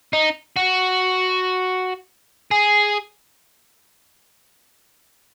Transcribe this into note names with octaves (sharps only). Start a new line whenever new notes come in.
D#4
F#4
G#4